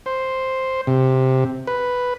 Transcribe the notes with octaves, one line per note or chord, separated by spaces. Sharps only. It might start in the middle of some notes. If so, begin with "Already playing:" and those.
C5
C3
B4